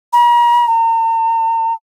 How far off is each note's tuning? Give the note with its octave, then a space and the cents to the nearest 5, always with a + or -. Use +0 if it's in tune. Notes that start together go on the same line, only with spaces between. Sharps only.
A#5 +40
A#5 -45